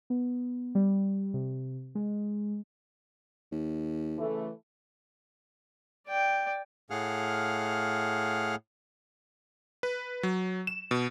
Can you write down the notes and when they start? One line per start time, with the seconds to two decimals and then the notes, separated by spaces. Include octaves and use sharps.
0.10 B3
0.75 G3
1.34 C3
1.95 G#3
3.52 D#2
4.18 C#3 E3 A3
6.08 D5 G5
6.90 A2 A3 G#4 F5 F#5 F6
9.83 B4
10.23 F#3
10.67 E7
10.91 B2